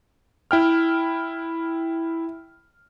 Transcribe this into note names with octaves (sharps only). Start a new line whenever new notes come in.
E4 G5 F6